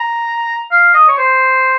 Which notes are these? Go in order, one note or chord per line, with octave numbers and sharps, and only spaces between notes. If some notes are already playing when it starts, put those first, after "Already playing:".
Already playing: A#5
F5
D#5
C#5
C5